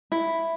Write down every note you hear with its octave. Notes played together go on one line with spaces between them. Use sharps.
E4